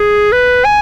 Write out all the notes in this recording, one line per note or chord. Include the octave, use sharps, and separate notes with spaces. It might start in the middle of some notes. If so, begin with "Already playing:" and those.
Already playing: G#4
B4
G#5